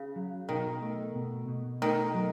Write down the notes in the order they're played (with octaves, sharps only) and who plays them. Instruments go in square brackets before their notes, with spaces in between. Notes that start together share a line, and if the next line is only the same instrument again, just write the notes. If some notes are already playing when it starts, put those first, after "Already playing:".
Already playing: [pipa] C#3
[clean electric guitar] F#3
[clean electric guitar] B2 [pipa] D#3
[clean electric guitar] A3
B2
B2
[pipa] D#3 [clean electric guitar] A3
[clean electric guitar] F#3